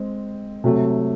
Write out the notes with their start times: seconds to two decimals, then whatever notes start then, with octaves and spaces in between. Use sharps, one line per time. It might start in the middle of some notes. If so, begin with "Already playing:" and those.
Already playing: G#3 C4
0.64 C3 F#3 A3